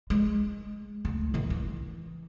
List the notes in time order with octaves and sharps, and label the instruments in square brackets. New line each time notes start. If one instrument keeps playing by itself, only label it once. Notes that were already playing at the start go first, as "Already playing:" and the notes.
[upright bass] G#3
D2
D#3 E3
E3